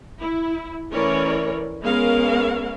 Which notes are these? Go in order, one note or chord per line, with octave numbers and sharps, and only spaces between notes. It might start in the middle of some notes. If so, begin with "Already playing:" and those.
E4
E3 A3 C#4 A#4 C#5 D5
G#3 B3 C#4 A#4 F5